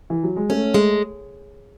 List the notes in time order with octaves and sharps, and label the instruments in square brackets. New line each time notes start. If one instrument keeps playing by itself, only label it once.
[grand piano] E3
F#3
G#3
[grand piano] A3 [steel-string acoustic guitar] C#4
[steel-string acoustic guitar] G#3